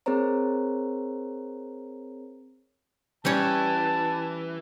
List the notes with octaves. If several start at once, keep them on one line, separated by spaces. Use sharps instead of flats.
C4 G#4 A#4 C5 C#5 A#5
E3 G3 C#4 C#5 A5